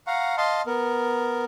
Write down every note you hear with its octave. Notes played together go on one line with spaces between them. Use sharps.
F5 F#5 A#5 C#6
D#5 F5 A5 C6
B3 A#4